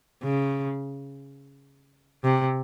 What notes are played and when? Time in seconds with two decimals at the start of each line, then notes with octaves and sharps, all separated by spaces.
0.23 C#3
2.24 C3